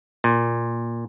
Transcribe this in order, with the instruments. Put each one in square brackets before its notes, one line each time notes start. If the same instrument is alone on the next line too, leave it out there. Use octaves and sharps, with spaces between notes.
[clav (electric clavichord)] A#2